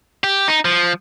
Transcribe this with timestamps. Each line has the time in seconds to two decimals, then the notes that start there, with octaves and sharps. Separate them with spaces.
0.24 G4
0.48 D#4
0.65 F3